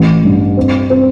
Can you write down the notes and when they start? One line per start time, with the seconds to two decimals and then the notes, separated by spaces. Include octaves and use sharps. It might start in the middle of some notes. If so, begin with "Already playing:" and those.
Already playing: A1
0.24 G2
0.57 C4
0.90 C4